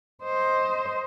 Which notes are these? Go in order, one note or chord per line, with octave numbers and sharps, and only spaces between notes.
C5 D#5